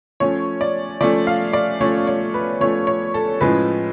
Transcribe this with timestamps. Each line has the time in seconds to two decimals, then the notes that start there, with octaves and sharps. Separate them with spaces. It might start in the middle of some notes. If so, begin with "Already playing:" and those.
0.20 F3 A3 C#4 C#5
0.61 D5
1.01 F3 A3 C#4 D5
1.27 F5
1.53 D5
1.81 F3 A3 C#4 C#5
2.07 C#5
2.34 B4
2.61 F3 A3 C#4 C#5
2.87 C#5
3.14 A4
3.41 A2 F3 G#3 C#4 B4